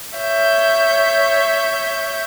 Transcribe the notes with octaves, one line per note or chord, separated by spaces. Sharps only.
C#5 E5 G6